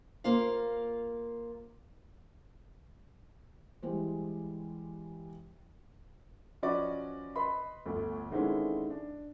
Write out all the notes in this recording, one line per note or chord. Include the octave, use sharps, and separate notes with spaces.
A#3 F4 C5 F5
E3 G3 G#3 C5
F3 C#4 F#4 B4 D5 D#5
B4 D#5 B5 C6
G1 D2
D3 D#3 G#3 C4 C#4 E4
D4